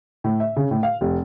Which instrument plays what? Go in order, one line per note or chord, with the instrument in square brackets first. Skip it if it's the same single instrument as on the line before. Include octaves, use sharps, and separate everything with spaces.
[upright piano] A2
E5
C#3
A2
F5
F1